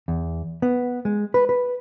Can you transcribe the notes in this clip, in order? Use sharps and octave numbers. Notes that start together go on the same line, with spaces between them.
E2
B3
G#3
B4
B4